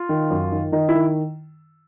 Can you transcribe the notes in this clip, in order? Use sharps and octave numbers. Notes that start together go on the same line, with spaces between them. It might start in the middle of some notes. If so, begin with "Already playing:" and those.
Already playing: F4
D#3
F#2
D#3
D#3 D#4
E4
D#3